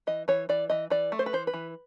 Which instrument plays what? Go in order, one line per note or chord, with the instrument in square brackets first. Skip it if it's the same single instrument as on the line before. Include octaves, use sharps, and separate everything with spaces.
[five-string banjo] E3 D#5
E3 C#5
E3 D5
E3 D#5
E3 D5
A3
C5
B4
E3 C5
B4
E3